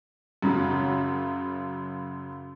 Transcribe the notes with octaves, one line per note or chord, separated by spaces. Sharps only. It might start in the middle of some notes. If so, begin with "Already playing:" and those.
F#2 C#3 F#3